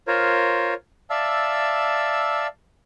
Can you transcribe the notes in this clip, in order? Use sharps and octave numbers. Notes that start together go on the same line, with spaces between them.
F4 A#4 C5 C#5
D5 E5 F5 A5 E6